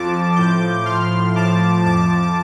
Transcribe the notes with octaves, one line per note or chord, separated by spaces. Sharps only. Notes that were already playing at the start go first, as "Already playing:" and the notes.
Already playing: F2 F3 A5 D6
A2 F3 D6 G6
A2 F3 C6 F6
A2 F3 A5 D6
F2 F3 A5 D6